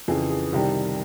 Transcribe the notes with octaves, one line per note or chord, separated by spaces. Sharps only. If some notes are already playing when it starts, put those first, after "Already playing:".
F2 C#3 E3 G#4
G#4
C2 C3 D#3 G3 G4